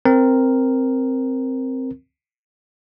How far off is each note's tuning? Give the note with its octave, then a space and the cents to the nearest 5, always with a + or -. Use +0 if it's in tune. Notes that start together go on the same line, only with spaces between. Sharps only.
C4 +0 A#4 +0